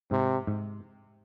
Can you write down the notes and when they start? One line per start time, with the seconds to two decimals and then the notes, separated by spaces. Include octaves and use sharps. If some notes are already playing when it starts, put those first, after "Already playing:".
0.11 G#2 C3
0.47 G#2